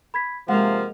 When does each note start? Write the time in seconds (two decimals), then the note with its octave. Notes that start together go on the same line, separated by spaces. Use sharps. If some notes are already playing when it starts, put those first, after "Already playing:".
0.14 B5 G#6 B6
0.48 C3 F3 G#3 A#3 F5 F#5